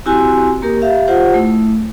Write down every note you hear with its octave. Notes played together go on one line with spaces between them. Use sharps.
C4 E4 F#4 G4 G#5 C6
A#3 G4 A#4
G4 E5 F5
F4 G4 C5 F#5
A3 E4